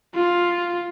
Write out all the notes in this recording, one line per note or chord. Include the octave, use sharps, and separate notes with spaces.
F4